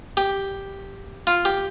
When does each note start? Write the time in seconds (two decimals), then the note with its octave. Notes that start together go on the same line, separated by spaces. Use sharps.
0.17 G4
1.27 F4
1.45 G4